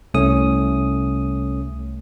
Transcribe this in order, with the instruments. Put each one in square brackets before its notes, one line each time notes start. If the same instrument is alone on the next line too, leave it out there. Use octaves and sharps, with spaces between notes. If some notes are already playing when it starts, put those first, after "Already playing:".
[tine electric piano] C2 A3 C#4 D#6